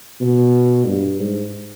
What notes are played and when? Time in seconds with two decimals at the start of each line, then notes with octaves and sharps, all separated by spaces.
0.20 B2
0.86 G2
1.19 G#2